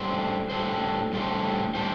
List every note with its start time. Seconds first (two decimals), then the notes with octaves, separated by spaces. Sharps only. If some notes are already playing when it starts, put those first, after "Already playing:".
Already playing: A2 G3 D4 A4 C5
0.50 A2 G3 D4 A4 C5
1.13 A2 G3 D4 A4 C5
1.75 A2 G3 D4 A4 C5